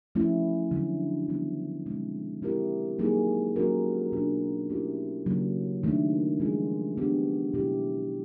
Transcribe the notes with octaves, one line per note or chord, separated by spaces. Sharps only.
F3 A3 C#4 E4
D3 F#3 A3
D#3 G3 B3
B2 G#3 C4
G#3 C4 E4 G4 A#4
F#3 A#3 D#4 G#4
F#3 A#3 C#4 F#4 A#4
B2 F#3 B3 D4 F4
A3 C#4 E4 G4 A#4
C#3 F#3 A#3
D#3 F#3 A3 D4
F3 G#3 C#4 F4 G#4
F#3 B3 D4 G4
B2 F#3 B3 E4 G4